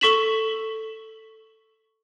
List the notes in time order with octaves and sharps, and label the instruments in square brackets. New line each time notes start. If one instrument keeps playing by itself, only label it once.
[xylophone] A4 C#6 B6 E7 F#7